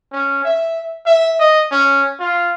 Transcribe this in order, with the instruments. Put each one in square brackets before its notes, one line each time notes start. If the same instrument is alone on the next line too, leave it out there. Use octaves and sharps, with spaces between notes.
[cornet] C#4
E5
E5
D#5
C#4
F4